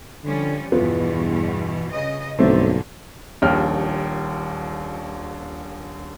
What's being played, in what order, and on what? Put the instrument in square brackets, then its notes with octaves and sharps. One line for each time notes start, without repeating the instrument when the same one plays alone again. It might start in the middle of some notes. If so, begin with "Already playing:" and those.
[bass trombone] D3 [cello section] F3 G3 C#4
[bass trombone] E2 [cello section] G2 B2 E3 [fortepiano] F3 B3
[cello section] C#3 D#5
[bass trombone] B1 [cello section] G2 A#2 D3 [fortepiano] A3 C4
[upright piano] D#1 A#1 D#2 G5 F6